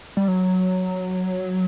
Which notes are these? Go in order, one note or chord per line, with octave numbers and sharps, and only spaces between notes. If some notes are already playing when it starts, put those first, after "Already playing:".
G3
F#3